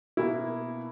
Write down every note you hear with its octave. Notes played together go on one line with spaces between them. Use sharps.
B2 A#3 E4